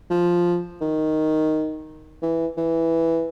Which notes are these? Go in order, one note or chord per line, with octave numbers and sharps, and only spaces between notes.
F3
D#3
E3
E3